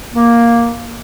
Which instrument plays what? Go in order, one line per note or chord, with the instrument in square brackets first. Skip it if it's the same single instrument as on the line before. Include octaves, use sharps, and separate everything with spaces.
[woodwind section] A#3